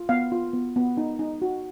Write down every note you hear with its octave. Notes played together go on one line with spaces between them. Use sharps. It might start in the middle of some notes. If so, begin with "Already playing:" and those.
Already playing: F4
B3 F5
F4
B3
B3
D#4
D#4
F#4